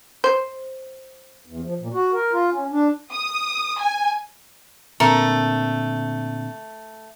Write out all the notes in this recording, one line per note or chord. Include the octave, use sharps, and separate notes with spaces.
C5
E2
F3
A#2
F#4
A#4
F4
C#4
D4
D#6
G#5
A#2 D3 A3 C4 A4 A#4